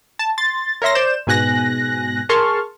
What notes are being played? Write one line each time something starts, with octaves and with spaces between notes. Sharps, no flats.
A5
C6 A6
A#4 C#5 E5 C6 A#6
C5 D5 G6 E7
G#2 B2 G#5 F#6 A#6
G#4 A#4 A5 C6 C#6 F6